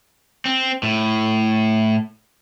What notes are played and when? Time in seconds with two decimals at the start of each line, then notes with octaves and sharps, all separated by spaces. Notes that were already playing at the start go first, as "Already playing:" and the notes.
0.45 C4
0.83 A2